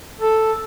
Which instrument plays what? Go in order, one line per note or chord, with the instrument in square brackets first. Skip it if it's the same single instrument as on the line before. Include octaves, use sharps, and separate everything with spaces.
[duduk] A4